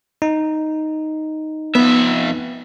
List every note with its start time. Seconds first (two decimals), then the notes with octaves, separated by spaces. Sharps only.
0.22 D#4
1.75 F2 B3 E5